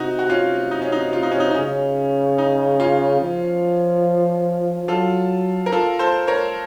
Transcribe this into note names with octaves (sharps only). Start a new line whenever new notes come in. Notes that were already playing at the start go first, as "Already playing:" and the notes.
Already playing: C3 D#4 F#4
F#4
C#4 F4
D#4
C#4
D#4
F4
D#4
C#4
D#4
D#4
C#3 C#4
D#4
C#4 F4
F3
F#3 F4 A4
A#4
F4 A4
A4 C5
A#4 C#5